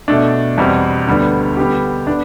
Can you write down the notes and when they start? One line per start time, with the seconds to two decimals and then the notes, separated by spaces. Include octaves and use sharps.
0.08 B2 A3 D4
0.58 E2 B2 G3 C4
1.07 D2 D3 G3 B3 D4
1.57 D3 G3 B3 D4 G4
2.07 B3 D4